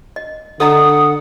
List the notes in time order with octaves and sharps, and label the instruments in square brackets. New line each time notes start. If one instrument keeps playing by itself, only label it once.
[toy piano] D#5
[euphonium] D3 [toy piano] A4 D#5 A#5 [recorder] F#5 [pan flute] D#6